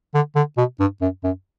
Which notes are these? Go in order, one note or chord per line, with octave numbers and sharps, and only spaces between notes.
D3
D3
B2
G2
F#2
F#2